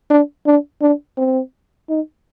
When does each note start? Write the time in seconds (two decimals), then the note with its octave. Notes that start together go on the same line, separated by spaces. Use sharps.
0.10 D4
0.46 D4
0.82 D4
1.18 C4
1.89 D#4